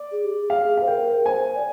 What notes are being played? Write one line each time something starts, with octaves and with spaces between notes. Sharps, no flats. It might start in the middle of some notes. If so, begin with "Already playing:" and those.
Already playing: D5
G#4
G4
G#4
G#4 F5
C5 F5
A#4 G5
C5 G#5
D5